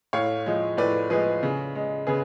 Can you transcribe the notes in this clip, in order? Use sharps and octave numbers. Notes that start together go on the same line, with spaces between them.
A2 C#5 F5
F3 G#3
A2 B4 D5
F3 G#3 G#4 B4
C#3
G#3
C#3 G#4 B4